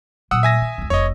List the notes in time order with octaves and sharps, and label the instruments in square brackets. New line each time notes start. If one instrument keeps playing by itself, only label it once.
[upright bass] A#2 F#3 [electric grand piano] F#5 D#6 E6
[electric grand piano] E5 G#5 A#6
[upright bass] D#3
F1 C#2
[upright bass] F1 F2 [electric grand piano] C#5 D#5